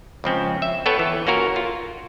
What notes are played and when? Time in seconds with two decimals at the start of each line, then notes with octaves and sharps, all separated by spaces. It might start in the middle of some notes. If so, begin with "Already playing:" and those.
0.24 C#2 F3 C4 C#4
0.62 E5
0.86 B3 A4 B4 C#5 G5 A5
0.99 E3
1.27 A#3 C#4 F4 F#4 A#4
1.56 F4